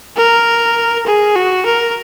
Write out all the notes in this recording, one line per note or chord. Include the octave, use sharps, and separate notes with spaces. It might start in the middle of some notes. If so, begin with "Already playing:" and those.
A#4
G#4
F#4
A#4